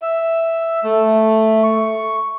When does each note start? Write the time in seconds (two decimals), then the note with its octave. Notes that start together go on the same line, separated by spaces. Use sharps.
0.02 E5
0.84 A3
1.63 C#6